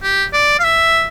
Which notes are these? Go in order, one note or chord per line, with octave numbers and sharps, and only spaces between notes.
G4
D5
F5
E5